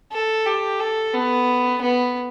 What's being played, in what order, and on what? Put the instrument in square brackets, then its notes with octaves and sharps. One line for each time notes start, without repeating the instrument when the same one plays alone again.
[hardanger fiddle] A4
G4
A4
B3
B3